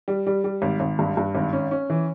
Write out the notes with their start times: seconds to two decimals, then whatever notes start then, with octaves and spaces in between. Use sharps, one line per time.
0.08 G3
0.27 G3
0.44 G3
0.62 G#1
0.80 G#1
0.99 G2
1.17 G2
1.35 G#1
1.53 C#4
1.71 C#4
1.90 E3